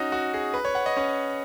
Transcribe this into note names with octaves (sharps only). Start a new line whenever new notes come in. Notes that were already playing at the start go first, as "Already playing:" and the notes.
Already playing: C#4 D#4 F#4
F#4
G#4
B4
C#5
F#5
D#5
C#4